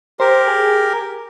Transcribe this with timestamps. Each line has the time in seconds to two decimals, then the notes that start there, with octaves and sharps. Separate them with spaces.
0.20 G4 A#4 C5
0.48 G#4